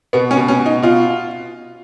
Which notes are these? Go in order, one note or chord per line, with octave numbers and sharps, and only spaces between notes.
B2 B3
C#4
B2
C#4
B2
D#4
B2 F4